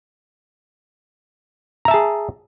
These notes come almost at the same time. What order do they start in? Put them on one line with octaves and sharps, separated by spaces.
A#5 E5 A5 G#4